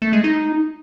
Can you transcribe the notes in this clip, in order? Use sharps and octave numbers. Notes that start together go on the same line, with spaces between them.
A3
G#3
D#4